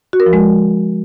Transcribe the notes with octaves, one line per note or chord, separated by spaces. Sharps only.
F#4
A#4
F3
G#3